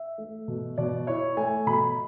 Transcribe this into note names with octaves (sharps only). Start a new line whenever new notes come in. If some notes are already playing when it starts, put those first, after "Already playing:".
Already playing: E5
A3
B2
B2 D5
E4 C#5
A3 G#5
B2 B5